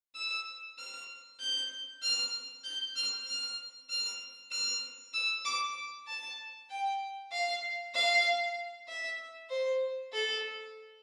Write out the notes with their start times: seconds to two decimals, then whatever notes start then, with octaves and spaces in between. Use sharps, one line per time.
0.15 E6
0.79 F6
1.40 G6
2.03 F6
2.64 G6
2.96 F6
3.27 F6
3.90 F6
4.51 F6
5.14 E6
5.46 D6
6.07 A5
6.70 G5
7.32 F5
7.95 F5
8.88 E5
9.50 C5
10.13 A4